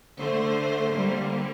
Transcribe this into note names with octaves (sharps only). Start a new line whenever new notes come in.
D3 A3 C5
D3 G3 A#3